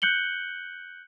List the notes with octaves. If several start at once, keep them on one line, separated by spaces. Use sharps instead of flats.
F#6 G6 C#7 F#7 G7